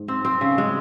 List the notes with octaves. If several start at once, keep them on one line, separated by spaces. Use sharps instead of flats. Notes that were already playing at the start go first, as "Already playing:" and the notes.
Already playing: G#2
C4
C4
C#3
G#3